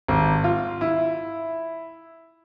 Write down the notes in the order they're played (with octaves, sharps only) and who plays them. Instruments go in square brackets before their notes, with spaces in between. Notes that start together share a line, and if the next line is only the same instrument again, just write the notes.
[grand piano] G#1
F4
E4